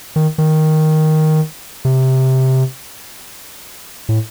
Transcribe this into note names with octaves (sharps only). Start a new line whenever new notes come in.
D#3
D#3
C3
A2